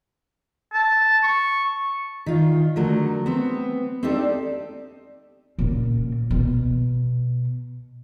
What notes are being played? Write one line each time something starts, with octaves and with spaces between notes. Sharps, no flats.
A5
C#6
D#3 F4
D3 F#3 A3 A#4
B3 C4
C4 D4 D#4 G4 A4 D5
A#2 C#3
B2